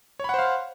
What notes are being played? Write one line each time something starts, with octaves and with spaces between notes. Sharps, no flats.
C5 C#5 F5 F#5 B5